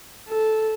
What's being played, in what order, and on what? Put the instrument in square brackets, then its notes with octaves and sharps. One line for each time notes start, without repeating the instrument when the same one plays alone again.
[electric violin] A4